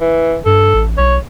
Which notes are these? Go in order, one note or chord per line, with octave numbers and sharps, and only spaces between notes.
E3
G2 A4
A1
B1 C#5